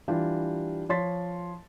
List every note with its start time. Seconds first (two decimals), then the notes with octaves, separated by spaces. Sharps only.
0.08 E3 G3 D4 F4 G4
0.89 F3 C#5 C6 A6 B6